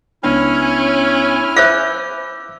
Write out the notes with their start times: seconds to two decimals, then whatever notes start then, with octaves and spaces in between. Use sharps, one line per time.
0.23 C#2 B3 C#4 D4 E4 G#5 F6
1.56 C5 E5 F5 D6 E6 G6